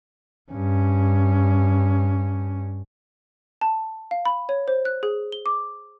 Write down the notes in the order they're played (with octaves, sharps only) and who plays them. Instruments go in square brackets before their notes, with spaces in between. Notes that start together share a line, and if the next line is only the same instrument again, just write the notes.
[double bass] G2 C#4
[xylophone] A5
F5
B5
C#5
C5
F#6
G#4
G7
D6